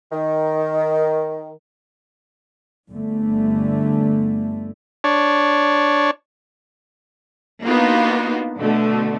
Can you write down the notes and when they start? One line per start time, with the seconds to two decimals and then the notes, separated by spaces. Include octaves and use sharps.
0.12 D#3
2.89 G1 D3 A3
5.04 D4 C#5
7.63 A#3 B3 D4 D#4 F4 F#4
8.59 B2 D3 A3